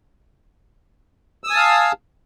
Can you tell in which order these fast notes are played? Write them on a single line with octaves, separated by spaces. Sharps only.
E6 D#6 G#5 A5 F5